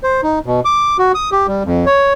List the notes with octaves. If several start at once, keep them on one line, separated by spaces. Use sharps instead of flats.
C5
D#4
B2
D6
F#4
D#6
G4
G3
F2
C#5